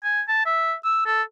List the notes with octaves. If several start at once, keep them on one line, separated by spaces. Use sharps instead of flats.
G#5
A5
E5
E6
A4